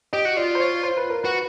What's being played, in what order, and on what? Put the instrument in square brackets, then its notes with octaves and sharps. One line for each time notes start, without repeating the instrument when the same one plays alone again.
[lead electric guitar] G4 [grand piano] D#5
[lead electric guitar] F#4
[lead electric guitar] F4 [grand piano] D5
[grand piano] C5
C#5
C5
B4
A#4
[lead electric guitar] F#4 [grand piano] B4